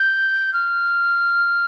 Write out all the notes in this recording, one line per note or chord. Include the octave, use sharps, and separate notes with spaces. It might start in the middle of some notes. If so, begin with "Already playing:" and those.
Already playing: G6
F6